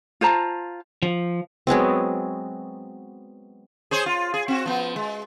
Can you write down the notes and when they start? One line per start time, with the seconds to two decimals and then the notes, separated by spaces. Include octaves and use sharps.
0.21 F4 C5 A5 A#5
1.03 F3
1.67 F#3 G#3 B3 C4
3.91 G#4 C5 C#5
4.06 F4
4.34 G#4
4.48 C4 F#4
4.66 F3 B3
4.96 G#3